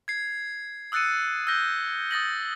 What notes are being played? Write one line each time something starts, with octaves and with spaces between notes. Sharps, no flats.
G#6 C7
D#6 E6 F#6 A6 C#7 D#7
E6 F#6 G6 A#6 G7
D#6 A6 A#6 F#7